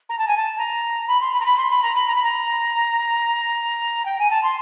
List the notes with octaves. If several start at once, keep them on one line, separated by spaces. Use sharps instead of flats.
A#5
A5
G#5
A5
A#5
B5
C6
B5
A#5
B5
C6
B5
A#5
B5
A#5
B5
A#5
G5
G#5
A5
C6